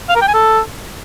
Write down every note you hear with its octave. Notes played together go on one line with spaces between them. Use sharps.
F5
A#4
G5
G#5
A4